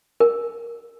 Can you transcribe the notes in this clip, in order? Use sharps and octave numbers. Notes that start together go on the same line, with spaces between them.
A#4